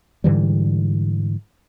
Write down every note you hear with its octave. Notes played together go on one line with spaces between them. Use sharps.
G#2 D3 E3 G3